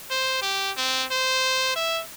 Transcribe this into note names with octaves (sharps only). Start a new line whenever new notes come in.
C5
G4
C4
C5
E5